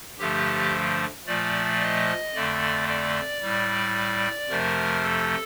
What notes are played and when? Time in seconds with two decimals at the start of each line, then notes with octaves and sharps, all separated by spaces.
0.19 G2 D3 F3 A3 G4
1.27 A#2 F3 A3 D5
1.81 D#5
2.34 F2 D3 A3 D5
2.88 D5
3.41 A2 G3
4.49 F2 C3 F3 A3 A#4
5.03 A4